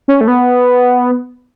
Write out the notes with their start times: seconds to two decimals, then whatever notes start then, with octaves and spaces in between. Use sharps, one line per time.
0.08 C#4
0.21 A3
0.28 B3